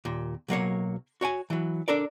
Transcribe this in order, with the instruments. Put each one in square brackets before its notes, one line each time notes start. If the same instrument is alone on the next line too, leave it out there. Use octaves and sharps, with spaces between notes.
[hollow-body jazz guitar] D#2 A#2
B1 F#3 A#3 C#5
F#4 C#5 G5 G#5
E3 F#3
D4 A4 A#4 D5